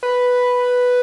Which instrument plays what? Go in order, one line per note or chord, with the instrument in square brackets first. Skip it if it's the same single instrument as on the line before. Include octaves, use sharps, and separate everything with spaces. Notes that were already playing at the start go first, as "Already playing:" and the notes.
[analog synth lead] B4